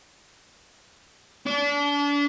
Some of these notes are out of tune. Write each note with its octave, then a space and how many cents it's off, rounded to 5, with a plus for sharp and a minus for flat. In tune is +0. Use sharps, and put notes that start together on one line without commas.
D4 -35